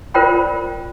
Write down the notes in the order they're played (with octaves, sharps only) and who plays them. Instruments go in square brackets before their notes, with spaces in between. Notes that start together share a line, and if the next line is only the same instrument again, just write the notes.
[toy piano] F4 A#4 C5 D5 G5 B5